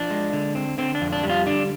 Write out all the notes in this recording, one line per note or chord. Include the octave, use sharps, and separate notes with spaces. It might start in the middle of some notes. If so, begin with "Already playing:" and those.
Already playing: F3 D4
G#3
D3
C4
D3 C4
D4
F2
D4
G3
F4
D3 D4